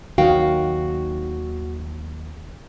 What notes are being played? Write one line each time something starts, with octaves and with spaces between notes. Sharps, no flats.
D#2 D#3 F#3 F#4 F5 G5